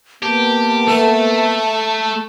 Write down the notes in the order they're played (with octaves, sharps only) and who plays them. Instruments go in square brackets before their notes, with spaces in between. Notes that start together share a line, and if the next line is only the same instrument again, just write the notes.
[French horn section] A#3 B3 [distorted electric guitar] G4 [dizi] A5
[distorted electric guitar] A3 [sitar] A4